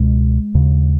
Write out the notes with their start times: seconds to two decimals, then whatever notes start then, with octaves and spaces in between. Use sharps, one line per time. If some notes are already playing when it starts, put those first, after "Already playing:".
Already playing: C#2 B2 G#3
0.55 D#2 C#3